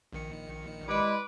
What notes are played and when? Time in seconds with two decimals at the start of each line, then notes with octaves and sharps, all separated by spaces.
0.13 A#1 D#3 C#7
0.87 G3 G#3 E4 B4 D6